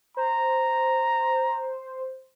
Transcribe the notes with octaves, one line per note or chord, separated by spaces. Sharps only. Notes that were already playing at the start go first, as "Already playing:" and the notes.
C5 A#5